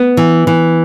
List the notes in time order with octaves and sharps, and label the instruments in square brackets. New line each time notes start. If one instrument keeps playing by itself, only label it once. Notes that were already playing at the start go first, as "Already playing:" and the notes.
Already playing: [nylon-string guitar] B3
E3
E3